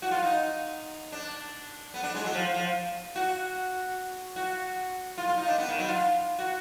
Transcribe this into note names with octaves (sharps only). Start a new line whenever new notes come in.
F#4
F4
D#4
D4
B3
D4
G#3
F#3
F3
F3
F#4
F#4
F4
F4
D#4
D4
B3
D#3
F#3
F4
F#4